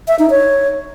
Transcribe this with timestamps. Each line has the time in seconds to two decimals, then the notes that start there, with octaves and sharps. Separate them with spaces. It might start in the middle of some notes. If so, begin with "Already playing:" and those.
0.08 E5
0.19 D#4
0.30 C#5